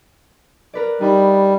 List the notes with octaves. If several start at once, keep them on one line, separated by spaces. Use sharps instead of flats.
A#4 B4 D5
G3 D#4 B5